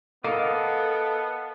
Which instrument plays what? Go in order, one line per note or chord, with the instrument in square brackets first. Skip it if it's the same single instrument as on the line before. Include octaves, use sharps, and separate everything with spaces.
[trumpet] B3 [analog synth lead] A4 [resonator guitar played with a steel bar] A#4 [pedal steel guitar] D#5 F5 D6